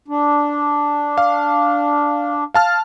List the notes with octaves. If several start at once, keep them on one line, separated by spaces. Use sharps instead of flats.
D4
F5
F5 A5 F6